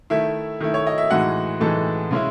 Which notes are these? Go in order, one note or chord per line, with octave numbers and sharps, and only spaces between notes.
D#3 A3 E4 E5
D#3 A3 E4
C#5
D#5
E5
A2 E3 G#3 D#4 F#4 F#5
A2 E3 G#3 D#4 A4 A5
C#3 G#3 C#4 E4